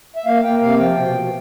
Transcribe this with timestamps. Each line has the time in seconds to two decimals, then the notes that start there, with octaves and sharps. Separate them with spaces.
0.16 E5
0.25 A#3 F5
0.43 A#3 G5
0.61 C3 F5
0.79 F3 G5
0.98 B2
1.16 B2